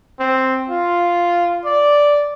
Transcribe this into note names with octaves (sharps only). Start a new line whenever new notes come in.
C4
F4
D5